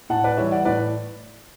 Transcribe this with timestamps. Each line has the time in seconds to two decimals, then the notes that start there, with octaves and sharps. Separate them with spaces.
0.10 A2 F#5 A5
0.24 B4 D5
0.37 E3 G3 C#5 E5
0.51 D5 F#5
0.65 A2 B4 D5